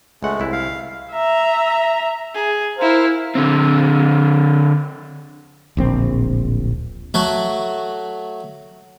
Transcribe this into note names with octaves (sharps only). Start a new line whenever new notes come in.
C#2 G#3 A3 F#5
C2 E4
F5
E5 A#5
G#4
E4 A#4 C5 F5
D3 C4
D1 A#1 C4
F#3 A3 F#4